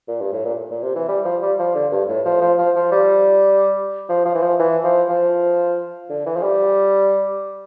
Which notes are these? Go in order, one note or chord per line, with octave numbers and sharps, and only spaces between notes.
A#2
G2
A2
A#2
A#2
C3
E3
G3
F3
G3
F3
D3
G2
A2
F3
F3
F3
F3
G3
F3
F3
E3
F3
E3
F3
F3
D3
E3
F3
G3